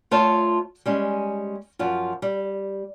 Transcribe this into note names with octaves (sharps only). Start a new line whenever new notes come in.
A3 F4 C5 C#5 A5
G3 G#3 C#4
F#2 F3 F4
G3